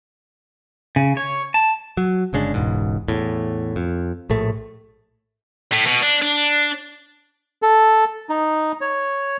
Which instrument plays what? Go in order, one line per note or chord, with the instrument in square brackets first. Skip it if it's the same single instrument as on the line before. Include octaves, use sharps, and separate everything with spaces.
[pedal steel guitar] C#3
C#5
A5
[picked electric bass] F#3
G1 C#3 G#3 D4
E1 C#2 G#2
E2 A2
F2
A#1 A2 A3
[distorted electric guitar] A2
B2
D4
D4
[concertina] A4
D#4
C#5